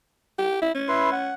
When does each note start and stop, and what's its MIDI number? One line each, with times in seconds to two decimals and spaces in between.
0.39 0.61 67
0.62 0.73 64
0.75 1.34 61
0.88 1.10 64
0.88 1.10 71
0.88 1.10 84
1.12 1.34 78